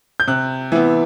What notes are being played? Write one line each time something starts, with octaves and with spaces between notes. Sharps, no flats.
G6
C3 F#6
E3 B3